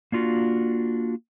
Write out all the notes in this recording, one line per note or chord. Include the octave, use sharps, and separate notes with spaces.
A#3 D4 F4 F#4